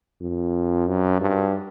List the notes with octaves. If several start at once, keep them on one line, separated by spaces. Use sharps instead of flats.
F2
F#2
G2